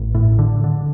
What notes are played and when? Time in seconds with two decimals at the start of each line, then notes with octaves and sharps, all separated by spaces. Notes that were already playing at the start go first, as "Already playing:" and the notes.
Already playing: A1
0.15 A2
0.39 D3
0.64 D3